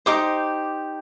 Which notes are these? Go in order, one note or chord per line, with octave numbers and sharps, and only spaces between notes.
D#4 G4 C5 D6